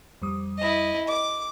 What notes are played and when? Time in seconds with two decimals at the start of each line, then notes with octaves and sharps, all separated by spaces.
0.22 F2 G3 D#6
0.58 E4 D#5
1.08 D#5 D6